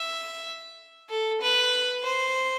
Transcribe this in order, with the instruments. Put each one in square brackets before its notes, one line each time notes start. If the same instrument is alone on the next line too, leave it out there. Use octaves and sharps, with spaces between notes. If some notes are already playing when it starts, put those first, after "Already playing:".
Already playing: [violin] E5
A4
B4
C5